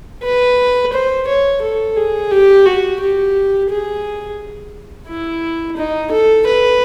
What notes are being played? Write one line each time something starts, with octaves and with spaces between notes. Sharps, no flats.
B4
C5
C#5
A4
G#4
G4
F#4
G4
G#4
E4
D#4
A4
B4